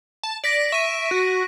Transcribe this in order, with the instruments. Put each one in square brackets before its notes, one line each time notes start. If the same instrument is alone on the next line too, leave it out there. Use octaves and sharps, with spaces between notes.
[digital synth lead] A5
[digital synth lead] D5 [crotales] A#6 B6 D7
[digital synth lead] E5 [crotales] C#6 D#7
[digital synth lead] F#4